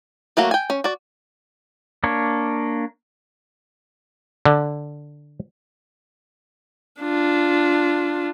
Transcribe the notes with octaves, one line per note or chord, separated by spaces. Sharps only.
F#3 A3 A#3 F#4
G5 G#5
C#4
F#4 D5
A#3 D4 C#5
D3
D4 F4